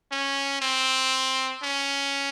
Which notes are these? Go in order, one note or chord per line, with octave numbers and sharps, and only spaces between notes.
C#4
C4
C#4